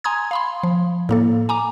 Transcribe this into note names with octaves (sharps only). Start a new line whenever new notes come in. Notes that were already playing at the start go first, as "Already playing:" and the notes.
G#5 A#5 C6 D#6 G#6
F5 B5 C6
F3
A2 A#3 A4
G#5 A#5 D6